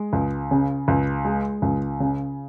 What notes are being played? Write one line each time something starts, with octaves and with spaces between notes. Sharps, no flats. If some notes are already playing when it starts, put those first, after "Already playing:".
Already playing: G#3
C#2
C#3
C#2
G#3
C#2
C#3